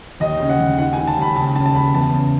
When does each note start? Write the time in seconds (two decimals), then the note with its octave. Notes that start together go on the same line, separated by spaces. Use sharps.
0.20 D#2 D#5
0.40 C#3
0.50 F#5
0.59 D#2
0.78 D#3 F#5
0.93 G#5
0.98 D#3
1.07 A5
1.17 D#2 B5
1.36 C#2 A5
1.56 C#3 A5
1.66 A5
1.75 C#2 B5
1.94 E2 A5
2.13 C#3